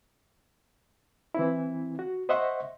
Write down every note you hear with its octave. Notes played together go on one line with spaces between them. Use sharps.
E3 C4 E4
F#4
C5 D#5 E5 F#5 C6 C#6